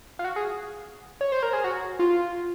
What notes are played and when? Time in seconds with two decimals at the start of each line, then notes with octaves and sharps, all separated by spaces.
0.19 F4
0.24 F#4
0.36 G#4
1.21 C#5
1.32 C5
1.43 A#4
1.53 G#4
1.64 F#4
1.99 F4